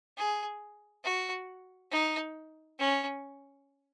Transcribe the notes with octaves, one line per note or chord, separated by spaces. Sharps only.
G#4
F#4
D#4
C#4